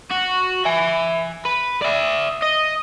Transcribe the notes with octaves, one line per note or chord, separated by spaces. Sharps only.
F#4
E5 G#5
B4
D5 E5
D#5